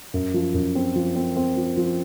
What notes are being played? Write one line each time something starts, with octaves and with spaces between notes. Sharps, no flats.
F#2
F3
F#2
C4
F3
C4
C4
F3
F3